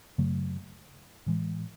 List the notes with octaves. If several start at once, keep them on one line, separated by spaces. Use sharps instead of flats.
F#2 C#3 F#3 A3
A2 E3 G#3